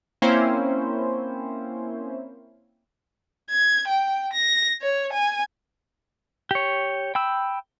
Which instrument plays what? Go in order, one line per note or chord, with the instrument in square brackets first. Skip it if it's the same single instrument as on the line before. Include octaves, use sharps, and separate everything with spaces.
[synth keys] A#3 C4 C#4 E4 C5
[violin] G#6
G5
A#6
C#5
G#5
[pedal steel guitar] G4 C#5
G5 B5 E6